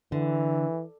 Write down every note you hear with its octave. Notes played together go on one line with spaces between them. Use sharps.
D3 E3